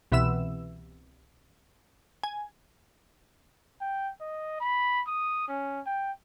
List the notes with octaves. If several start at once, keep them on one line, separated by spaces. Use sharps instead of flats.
C2 B2 E3 E5 E6 E7
G#5
G5
D#5
B5
D#6
C#4
G5